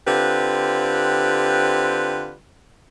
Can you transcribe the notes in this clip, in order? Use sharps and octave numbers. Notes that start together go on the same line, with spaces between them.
D3 C4 F4 G4 B4